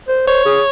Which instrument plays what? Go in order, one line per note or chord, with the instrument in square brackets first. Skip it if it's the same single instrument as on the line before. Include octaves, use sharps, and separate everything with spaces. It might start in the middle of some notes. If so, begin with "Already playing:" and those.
[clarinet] C5
[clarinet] C5 [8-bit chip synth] C#5
[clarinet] G#4